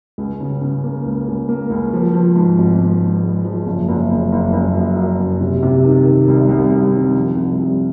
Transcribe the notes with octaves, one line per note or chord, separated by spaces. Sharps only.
C#2
C#3
C#3
A#3
C#2
C#2
A#3
C#2
F3
F3
G#2
G#1
G#2
G#2
G#3
F3
F#1
F#1
F#1
F#1
F#1
F#2
F#2
F#1
C3
C3
D#3
D#3
C2
C2
C2
D#3
F3
C2
C2